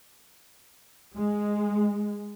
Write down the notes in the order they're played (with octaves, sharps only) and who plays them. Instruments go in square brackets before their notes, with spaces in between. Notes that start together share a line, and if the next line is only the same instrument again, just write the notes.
[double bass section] G#3